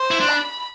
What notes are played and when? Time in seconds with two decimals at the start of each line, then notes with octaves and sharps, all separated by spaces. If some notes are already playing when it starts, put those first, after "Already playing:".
Already playing: C5
0.11 E4
0.20 D4
0.30 B5